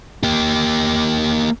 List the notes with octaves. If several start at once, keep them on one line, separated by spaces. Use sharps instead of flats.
A#3 G4